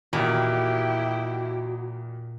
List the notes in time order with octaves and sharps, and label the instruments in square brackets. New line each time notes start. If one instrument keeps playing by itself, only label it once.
[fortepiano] E2 D#3 [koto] A#2 [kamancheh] E4 G4 [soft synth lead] F#4